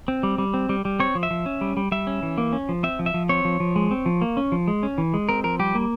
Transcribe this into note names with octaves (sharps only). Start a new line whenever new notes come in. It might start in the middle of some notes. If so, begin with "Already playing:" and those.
C4
G3
G3
C4
G3
G3
C4 C#5
F3
E5
F3
C#4
G3
G3
G3 E5
C#4
E3
A#3
C#4
F3
C4 E5
F3
E5
F3
C4 C#5
F3
F3
G#3
C4
F3
A#3
C#4
F3
G#3
C#4
E3
G#3
C4 A#4
F3 A#4
G3 G4
A#3